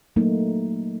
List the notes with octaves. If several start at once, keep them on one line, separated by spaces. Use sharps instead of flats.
F#3 A3 A#3 D#4